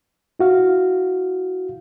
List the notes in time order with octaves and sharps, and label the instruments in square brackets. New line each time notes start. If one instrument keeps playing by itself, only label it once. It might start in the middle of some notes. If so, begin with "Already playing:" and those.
[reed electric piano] E4 F#4 F5